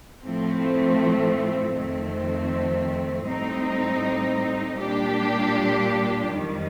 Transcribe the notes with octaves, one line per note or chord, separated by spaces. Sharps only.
A2 F3 A3 C4
F2 D#3 A3 C4
A2 G3 C4 D#4
A#2 G3 D4 G4
F2 D#3 G3